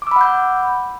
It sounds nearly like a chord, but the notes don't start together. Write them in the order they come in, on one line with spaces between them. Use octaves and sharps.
D6 E6 B5 F#5 G6